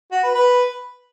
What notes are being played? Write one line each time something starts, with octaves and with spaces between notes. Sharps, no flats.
F#4
B4
B4